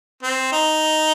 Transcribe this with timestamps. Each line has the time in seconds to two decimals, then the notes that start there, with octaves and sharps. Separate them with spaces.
0.23 C4
0.52 D#4